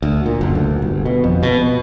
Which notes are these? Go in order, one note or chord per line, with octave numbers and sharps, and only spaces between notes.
D2
A#2
F#1
D2
G1
B2
F2
B2
B2